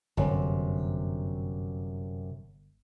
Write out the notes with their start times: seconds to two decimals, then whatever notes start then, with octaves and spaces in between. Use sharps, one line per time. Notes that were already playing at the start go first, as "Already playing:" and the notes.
0.17 G1 F#2 C3